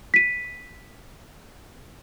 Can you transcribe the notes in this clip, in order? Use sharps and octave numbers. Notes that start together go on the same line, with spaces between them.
B6 D#7